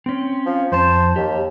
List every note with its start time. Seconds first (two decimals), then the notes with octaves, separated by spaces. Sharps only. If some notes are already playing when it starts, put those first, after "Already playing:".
0.06 C4 C#4
0.46 F3
0.72 F2 C5 A5
1.16 D#2 G4